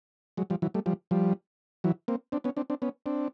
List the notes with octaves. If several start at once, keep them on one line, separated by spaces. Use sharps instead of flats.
F#3 G#3
F3 G3
E3 F#3
G3 A3
F3 G3
F3 G3
E3 F#3
A#3 C4
C4 D4
B3 C#4
C4 D4
C4 D4
B3 C#4
C4 D4